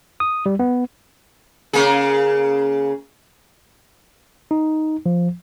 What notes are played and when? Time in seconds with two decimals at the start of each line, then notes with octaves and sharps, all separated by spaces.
0.20 D#6
0.46 G3
0.59 B3
1.73 C#3 A#3 G#4
4.51 D#4
5.06 F3